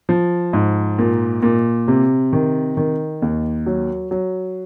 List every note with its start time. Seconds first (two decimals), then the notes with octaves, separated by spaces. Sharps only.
0.09 F3
0.53 G#2
0.99 A#2
1.43 A#2
1.88 C3
2.33 D#3
2.77 D#3
3.22 D#2
3.66 F#3
4.11 F#3